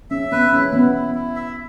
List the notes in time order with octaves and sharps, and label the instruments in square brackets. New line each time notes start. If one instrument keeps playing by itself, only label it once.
[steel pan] C#4 [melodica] E5
[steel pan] B3 [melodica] B4
[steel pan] C#4 [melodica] E4
[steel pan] B3 [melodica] E4
[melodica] E4
E4
E5